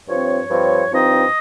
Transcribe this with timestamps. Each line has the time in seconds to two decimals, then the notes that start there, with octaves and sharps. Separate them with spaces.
0.07 G2 F3 C4 C#5
0.49 G2 F3 C4
0.90 G2 F3 C4 D#4 D#5